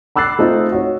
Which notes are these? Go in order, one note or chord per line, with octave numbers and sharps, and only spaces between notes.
B5 D6 E6 F#6 A6 C7
A3 C4 D#4 F4
F#4 C#5